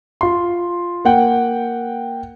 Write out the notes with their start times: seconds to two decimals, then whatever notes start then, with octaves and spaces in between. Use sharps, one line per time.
0.21 F4 C6
1.05 A#3 F#5 G5